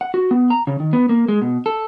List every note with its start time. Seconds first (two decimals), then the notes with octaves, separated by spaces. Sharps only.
0.01 F#5
0.14 F#4
0.31 B3
0.50 A#5
0.67 C#3
0.80 D#3
0.93 B3
1.09 A#3
1.28 G#3
1.42 B2
1.66 A4